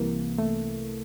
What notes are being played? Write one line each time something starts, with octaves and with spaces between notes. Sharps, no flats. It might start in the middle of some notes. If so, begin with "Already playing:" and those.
Already playing: C2 C3 E3 A#3
A3